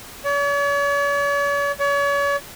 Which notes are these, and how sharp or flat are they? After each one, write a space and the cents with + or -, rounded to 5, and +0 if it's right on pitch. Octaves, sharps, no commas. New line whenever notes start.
C#5 +45
C#5 +40